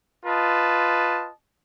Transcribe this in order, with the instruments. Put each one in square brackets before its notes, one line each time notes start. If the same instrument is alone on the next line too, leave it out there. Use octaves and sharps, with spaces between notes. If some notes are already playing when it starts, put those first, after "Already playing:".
[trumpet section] F4 B4 D#5 A5